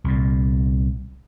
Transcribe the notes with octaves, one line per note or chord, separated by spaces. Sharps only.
C2 A#2